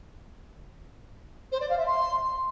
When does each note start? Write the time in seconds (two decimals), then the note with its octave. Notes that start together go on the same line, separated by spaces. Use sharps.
1.52 C5
1.61 D5
1.69 F5
1.78 E5
1.87 C6